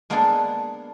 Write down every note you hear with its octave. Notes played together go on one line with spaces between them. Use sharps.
G#3 A#3 B3 D4 G#4 A4